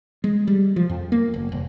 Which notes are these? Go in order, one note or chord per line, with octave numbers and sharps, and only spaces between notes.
G#3
G3
F3
F2
A#3
F#1
F1